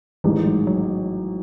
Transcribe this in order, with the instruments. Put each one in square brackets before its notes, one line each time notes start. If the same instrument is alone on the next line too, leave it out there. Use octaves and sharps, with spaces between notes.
[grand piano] A1 G#2 D#3 G#3 D#4 [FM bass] E3
[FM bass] F#3
F#3